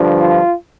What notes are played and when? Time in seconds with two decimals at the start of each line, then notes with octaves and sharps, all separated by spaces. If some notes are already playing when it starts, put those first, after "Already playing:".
Already playing: G2 D3 F3
0.19 F4